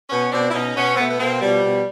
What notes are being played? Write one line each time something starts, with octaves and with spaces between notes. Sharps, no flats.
B2 B3 C#4
B2 C4 D4
E4
B2 C#4 D#4
B2 B3 C#4
C4
B2 A3 B3
B3
B2 A#3 C4
B2 F3 G3
B2